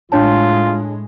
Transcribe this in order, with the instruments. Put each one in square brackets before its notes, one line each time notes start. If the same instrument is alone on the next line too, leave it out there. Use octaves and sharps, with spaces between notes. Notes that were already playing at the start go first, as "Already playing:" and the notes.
[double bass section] A2 G#3 [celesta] D4 C#5 A5 [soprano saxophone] F4